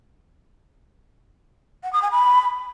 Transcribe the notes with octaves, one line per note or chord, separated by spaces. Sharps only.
F#5
D#6
G#5
B5